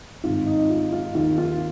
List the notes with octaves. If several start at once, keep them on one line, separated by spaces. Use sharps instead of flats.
G#1 G#2 D#3 F4
D#4
F4
F4
D#2 D#3 F4
F4